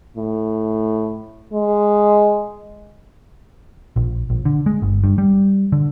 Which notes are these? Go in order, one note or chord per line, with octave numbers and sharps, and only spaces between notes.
A2
G#3
A#1
A#1
D3
G#3
G1
G2
G3
D3